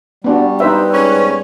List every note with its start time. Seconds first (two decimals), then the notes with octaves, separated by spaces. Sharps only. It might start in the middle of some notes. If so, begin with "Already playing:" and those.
0.24 G3 B3 D4 F#4
0.60 D#4 B4 C5 E5
0.92 G#2 B3 C#4